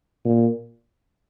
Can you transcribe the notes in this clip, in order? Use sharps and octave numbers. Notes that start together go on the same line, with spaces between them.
A#2